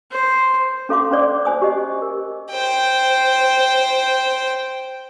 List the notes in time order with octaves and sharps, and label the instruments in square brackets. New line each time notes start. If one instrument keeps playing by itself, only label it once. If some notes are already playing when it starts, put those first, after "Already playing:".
[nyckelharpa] C5
[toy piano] C#4 A4 F5 C6 D6
C#4 C5 D5 D6 D#6
C5 G#5 D#6
G4 D#5
A#4
[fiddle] C5 G5